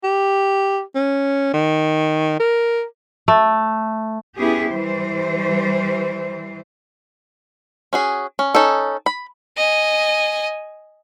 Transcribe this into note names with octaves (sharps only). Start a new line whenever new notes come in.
G4
C#4
D#3
A#4
A3
B3 C#4 E4 G4 G#4
E3 G3 C5
C#4 F#4 G#4
C#4
C#4 D#4 A4
B5
D#5 G#5